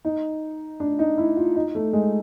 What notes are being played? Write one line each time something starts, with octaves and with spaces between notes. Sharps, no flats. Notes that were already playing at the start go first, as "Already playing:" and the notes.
D#4
D4
D#4
E4
F4
D#4
A3
G#3